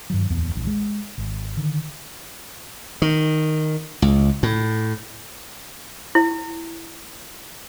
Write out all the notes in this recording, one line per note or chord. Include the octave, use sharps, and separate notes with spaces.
G2 D#3 F#3
D1 G#1 E2
D#1 A#1 E2
G#3
G#1
D3 D#3
D#3
C#2
A2
E4